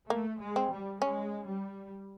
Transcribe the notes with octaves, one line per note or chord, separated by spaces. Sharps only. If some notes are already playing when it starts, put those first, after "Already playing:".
A3 A#3
G#3
C4
G3
G#3 C#4
G3